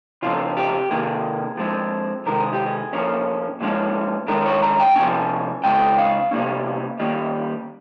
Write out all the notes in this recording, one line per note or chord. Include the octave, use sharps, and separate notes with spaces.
C#3 F3 C4 F4
G4
C3 D#3 A#3 G#4
F3 G#3 C4
C3 D#3 G#3 A#4
G#4
G4
G#4
A#2 F3 A#3 C#4
A#2 F3 G#3 C#4
D#3 G#3 C#4 A#4
C#5
A#5
G5
C3 F3 A#3 C#4 G#5
C#3 G#3 C4 G5
F5
C3 G3 A#3 C#4
D#3 G3 A#3 C#4